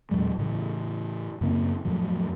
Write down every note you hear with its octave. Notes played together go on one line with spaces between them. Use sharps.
E2 A#2 F#3 G#3
A2 C#3 E3
F#2 C#3 A#3 C4
F2 A2 F3 F#3